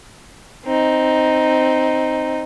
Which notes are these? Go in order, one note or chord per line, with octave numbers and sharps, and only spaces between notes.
C4 D#4